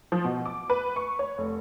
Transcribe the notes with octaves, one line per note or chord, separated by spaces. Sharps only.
F3
B2
D6
B4
C#6
C#5
F1